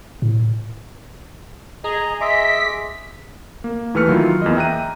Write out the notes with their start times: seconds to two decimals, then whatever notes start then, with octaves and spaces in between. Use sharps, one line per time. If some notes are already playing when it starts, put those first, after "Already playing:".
0.22 A2
1.84 G#4 D#5 A#5
2.21 D#5 E5 C6 D6 B6
3.64 A#3
3.94 D#2 E3 A3 B4 F6 C#7
4.08 D#3 F#3 E4 F4
4.42 E2 A#3 D#5
4.56 E5 G5 A#5 F#6 D#7